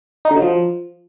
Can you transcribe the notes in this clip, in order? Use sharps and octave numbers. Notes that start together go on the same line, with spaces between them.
D#4
D3
F#3
F3